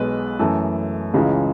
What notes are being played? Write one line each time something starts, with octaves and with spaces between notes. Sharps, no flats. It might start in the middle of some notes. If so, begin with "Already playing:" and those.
Already playing: B1 B2 G#3 B3 B4
F#2 E3 A3 A4
C#2 C#3 E3 G#3